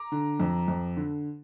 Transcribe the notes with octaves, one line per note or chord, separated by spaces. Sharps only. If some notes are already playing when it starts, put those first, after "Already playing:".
Already playing: A#5 D6
D3
F2
F2
D3